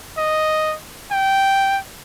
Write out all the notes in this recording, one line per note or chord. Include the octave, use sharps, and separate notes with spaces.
D#5
G5